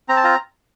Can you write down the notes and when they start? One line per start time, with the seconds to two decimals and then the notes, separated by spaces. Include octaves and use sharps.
0.09 C4 A#5
0.16 A5
0.24 F4 A#5